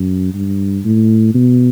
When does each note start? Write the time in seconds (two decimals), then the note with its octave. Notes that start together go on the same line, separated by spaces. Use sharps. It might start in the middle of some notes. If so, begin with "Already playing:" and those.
Already playing: F#2
0.34 G2
0.85 A2
1.34 B2